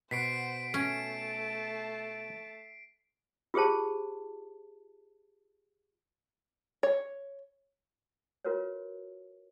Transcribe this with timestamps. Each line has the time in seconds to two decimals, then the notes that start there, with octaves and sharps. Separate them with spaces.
0.11 B2 B3 F#4 C5 F#5 B6 C7 D7
0.74 A3 C#4 A5 D7
3.54 F4 G4 G#4 C5 A5
6.83 C#5
8.45 F4 F#4 A#4 B4 C#5